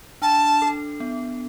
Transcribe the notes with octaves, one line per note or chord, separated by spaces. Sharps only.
D4 A5
A4
B3